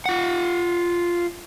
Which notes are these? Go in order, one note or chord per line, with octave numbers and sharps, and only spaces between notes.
F4 F#5